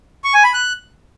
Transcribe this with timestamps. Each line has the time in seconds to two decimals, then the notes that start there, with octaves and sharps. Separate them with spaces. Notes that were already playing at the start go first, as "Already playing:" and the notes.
0.24 C#6
0.34 G#5
0.44 B5
0.54 F#6